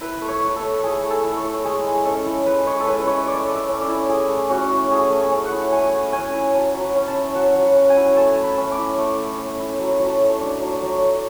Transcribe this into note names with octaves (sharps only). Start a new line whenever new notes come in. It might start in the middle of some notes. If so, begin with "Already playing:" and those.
E4 B4
A3
C#5
E4
A4
A3
E4 G#4
A3
A4
E4
C#5
A3
G#3 G#4
G#3
C#4 A4
E4
G#3 B4
G#3 C#5
A4
C#4 B4
E4 C#5
A3 D5
A3
E5
C#4
D5
E4
A3 G#4
A3
C#4 F#4
E4
A3 G#4
A3
G#4
C#4
F#5
E4
A3 G#5
A3
C#4 G#5
E4
F#3 A5
F#3
B5
C#4
A5
E4
F#3 F#5
F#3
F#5
C#4
G#5
E4
A3 A5
A3
B5
C#4
D6
E4
A3
A3
C#4
E4
F#3
F#3
A5
A3
D4
F#3
F#3
A3